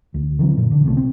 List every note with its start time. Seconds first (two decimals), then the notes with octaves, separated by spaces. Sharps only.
0.14 D2
0.39 D3 E3 F#3 C4
0.57 F#2 A#2
0.71 D3
0.84 C2 C3 E3 A3
0.97 C4